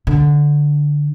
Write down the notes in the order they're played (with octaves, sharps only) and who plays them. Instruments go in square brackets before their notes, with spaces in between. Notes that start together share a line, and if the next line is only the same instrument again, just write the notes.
[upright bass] D3